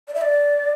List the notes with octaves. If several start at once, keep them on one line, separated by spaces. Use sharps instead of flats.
D5
E5
D5